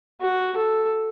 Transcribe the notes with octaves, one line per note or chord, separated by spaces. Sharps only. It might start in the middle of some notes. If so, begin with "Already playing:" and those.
F#4
A4